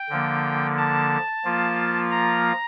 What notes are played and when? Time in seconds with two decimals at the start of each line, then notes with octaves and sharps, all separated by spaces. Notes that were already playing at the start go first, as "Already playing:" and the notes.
Already playing: G5
0.09 D3 F3 A#3
0.78 A5
1.44 F3 A#3 F4
2.11 A#5